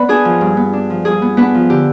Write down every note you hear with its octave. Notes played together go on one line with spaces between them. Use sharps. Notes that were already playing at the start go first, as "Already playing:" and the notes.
Already playing: B3 B4 D5 B5
D4 G#4 G#5
F3
G2
B3
D4
F3
G2 G#4 G#5
B3
B3 D4 B4
F3
D3 G4